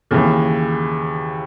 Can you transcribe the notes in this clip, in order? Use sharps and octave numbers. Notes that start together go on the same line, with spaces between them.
D#2 C#3 E3